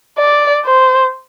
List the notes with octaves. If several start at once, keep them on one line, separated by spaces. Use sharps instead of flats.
D5
C5